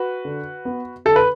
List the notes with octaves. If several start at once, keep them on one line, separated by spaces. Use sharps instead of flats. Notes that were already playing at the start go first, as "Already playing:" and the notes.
Already playing: F#4 B4
D3
B3
D3 A4
B4